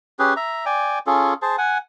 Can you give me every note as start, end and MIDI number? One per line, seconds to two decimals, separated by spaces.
0.19 0.34 61
0.19 0.34 67
0.19 0.34 68
0.19 0.34 71
0.37 0.65 76
0.37 0.65 82
0.66 0.99 74
0.66 0.99 79
0.66 0.99 80
1.07 1.34 61
1.07 1.34 65
1.07 1.34 68
1.07 1.34 69
1.42 1.56 68
1.42 1.56 72
1.42 1.56 81
1.58 1.78 78
1.58 1.78 80